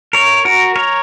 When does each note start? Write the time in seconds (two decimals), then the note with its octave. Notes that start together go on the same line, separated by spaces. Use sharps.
0.13 A#4 C#5
0.45 F#4 A#4
0.76 A#4 C#5